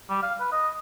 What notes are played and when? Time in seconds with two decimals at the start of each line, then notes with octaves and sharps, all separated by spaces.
0.10 G3
0.23 F5
0.40 B4
0.52 D#5